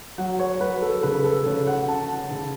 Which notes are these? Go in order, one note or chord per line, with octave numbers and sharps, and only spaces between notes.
F#3 F#5
C#5
F#3 B4
A4
C#3 B4
A4
C#3 C#5
F#5
C#4 A5
C#3